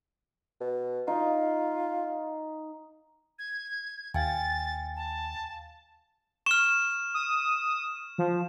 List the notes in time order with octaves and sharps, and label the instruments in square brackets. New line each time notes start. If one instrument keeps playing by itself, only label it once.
[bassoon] B2
[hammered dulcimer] D#4 [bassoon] F4
[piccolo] G#6
[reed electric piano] D#2 [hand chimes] F5 G5 G#5 [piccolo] A6
[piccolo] A5
[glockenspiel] C#6 F6 [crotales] E7
[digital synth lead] D#6
F3